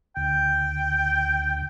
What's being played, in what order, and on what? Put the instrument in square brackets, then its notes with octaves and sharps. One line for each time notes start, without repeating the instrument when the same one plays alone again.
[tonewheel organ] D2 [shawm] G5